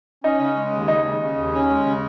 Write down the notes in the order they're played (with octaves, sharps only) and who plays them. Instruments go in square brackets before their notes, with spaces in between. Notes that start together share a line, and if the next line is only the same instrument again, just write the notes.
[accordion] C#4 [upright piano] D#4
[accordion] C#3
G#3
D#2
[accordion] C#3 [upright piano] D#4
[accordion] C#3
C#3
D#2
C#4
G#3
C#3